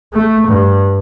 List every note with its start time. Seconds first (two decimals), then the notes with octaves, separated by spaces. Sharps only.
0.13 A3
0.48 G2